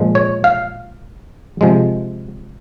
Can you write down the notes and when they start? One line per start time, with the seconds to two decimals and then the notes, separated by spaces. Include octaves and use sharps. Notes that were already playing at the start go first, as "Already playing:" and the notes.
Already playing: A#2 F3 G#3
0.15 C#5
0.44 F5
1.61 C3 F3 G#3